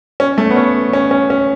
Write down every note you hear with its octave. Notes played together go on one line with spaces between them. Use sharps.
C#4
A3
B3
C#4
C#4
C#4
C#4